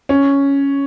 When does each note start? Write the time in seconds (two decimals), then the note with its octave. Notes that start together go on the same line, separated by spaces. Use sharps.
0.09 C#4